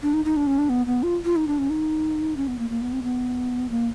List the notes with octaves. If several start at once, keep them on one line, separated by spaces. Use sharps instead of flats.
D4
D#4
D#4
D4
C#4
D4
B3
B3
F4
F4
D#4
D4
C#4
D#4
C#4
B3
A#3
A#3
B3
C4
B3
A#3